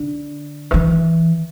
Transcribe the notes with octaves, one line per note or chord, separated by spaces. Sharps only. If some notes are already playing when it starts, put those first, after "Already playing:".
Already playing: D3
D#3
E3